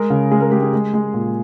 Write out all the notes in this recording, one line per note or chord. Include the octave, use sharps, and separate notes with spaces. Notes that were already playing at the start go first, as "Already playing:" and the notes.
Already playing: G#3 A#4
C#3
G#3 G#4
A#4
G#3 G4
G#4
G#3
G#3
A#2